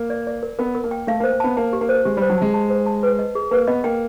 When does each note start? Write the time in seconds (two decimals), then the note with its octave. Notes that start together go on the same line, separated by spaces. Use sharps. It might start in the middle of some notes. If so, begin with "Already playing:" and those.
Already playing: A#3
0.10 D5
0.27 D5
0.43 A#4
0.59 B3 A#4
0.75 A#4
0.84 A#3
0.91 G5
1.07 A3 F5
1.20 A#3
1.24 C5
1.32 A#3
1.40 B3 A5
1.57 A#3 A5
1.73 G4
1.81 A#3
1.89 C5
2.05 G#3 G4
2.17 G3
2.22 C5
2.30 F#3
2.38 G#3 A5
2.54 A5
2.70 C5
2.86 A5
3.03 B4
3.19 D#5
3.35 G#4
3.51 A#3 B4
3.67 B3 D#5
3.84 A#3 G5